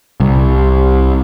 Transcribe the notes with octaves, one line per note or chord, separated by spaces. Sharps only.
C2